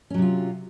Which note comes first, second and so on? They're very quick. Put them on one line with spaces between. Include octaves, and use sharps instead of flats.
C#4 F#3 C3 F4